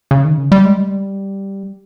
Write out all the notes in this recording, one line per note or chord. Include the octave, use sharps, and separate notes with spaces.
C#3
D#3
C#3
G3
G#3
G3